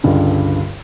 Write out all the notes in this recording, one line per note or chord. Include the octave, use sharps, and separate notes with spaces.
C#2 G2 D3